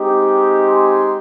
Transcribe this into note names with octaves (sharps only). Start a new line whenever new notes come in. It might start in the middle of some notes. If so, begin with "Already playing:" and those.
Already playing: G#3 C4 D#4 G4
G#5 C6